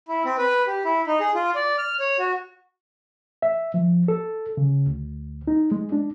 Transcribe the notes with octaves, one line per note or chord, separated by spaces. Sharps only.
E4
C4
B4
G4
E4
D#4
G#4
F4
D5
F6
C#5
F#4
E5
F3
A4
C#3
D2
D#4
G#3
D4